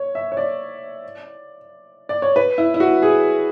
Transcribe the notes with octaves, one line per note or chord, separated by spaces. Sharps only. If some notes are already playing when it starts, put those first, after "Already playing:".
Already playing: C#5
E5
C#5
D5
D5
C#5
B4
E4
E4
F#4
G#4